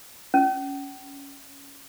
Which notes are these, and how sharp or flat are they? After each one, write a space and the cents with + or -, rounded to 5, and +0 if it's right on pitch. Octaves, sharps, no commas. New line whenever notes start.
C#4 +0